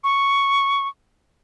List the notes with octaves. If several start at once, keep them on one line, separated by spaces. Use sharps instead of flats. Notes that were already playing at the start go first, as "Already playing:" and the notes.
C#6